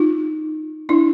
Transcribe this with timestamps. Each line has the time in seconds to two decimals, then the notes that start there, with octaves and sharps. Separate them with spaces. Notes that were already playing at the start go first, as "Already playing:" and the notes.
Already playing: D#4 F4
0.89 D4 E4